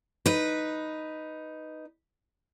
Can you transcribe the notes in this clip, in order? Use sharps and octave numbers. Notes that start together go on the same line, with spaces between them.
D#4 B4